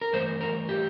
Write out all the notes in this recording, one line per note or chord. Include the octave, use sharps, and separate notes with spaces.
A#4
G2 E3 A3 C5
A#4
G4